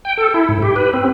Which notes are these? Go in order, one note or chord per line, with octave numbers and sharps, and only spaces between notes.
G5
A4
E4
G#2
G4
B4
C4